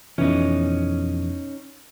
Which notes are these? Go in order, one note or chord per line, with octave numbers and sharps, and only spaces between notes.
F2 B2 E3 C#4 D#4